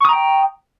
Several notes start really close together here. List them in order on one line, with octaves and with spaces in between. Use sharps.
C#6 D#6 A#5 G5